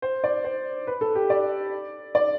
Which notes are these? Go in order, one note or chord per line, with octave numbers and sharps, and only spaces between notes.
C5
D5
C5
B4
A4
G4
D5
D5